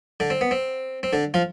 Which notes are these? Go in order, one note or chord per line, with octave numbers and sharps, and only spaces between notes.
D3 D4
C4
B3
C4
C4
D3 D4
F3 F4